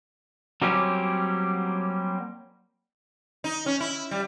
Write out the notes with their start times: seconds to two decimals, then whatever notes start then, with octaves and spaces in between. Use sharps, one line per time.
0.62 F#3 G3 A#3 C4 C#4 G4
3.44 D#4
3.66 C#4
3.80 E4
4.11 G3